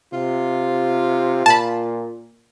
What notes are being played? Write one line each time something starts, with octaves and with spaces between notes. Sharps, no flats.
C3 F4
A#2 A5 B5